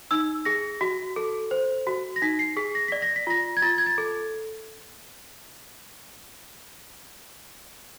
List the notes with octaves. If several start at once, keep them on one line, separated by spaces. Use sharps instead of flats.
D#4 E6
G#4 A#6
F#4
A4
C5
F#4
A#6
D#4 B6
C7
G#4 B6
A#6
D5 B6
A#6
B6
F4 A#6
G#6
F4 A6
G#6
A6
A4